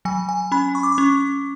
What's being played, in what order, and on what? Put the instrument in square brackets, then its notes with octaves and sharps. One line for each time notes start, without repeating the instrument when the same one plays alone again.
[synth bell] F#3 G#5
G#5
C#4 B5
C#6
D6
C#6
C#4